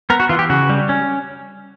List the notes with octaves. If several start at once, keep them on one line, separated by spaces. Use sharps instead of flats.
B3 A#4
F#4
E3 F4
G4
C#3 F#4
G3
C#4